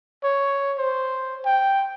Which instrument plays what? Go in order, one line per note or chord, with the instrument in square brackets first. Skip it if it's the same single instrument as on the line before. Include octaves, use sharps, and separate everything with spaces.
[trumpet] C#5
C5
G5